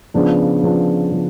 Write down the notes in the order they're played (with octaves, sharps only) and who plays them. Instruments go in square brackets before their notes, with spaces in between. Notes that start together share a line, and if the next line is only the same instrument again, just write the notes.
[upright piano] C#3 F3 B3 D4
C#3 F3 B3 D4
C#3 F3